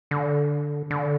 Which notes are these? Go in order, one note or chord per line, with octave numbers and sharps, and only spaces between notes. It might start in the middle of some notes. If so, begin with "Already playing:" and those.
D3
D3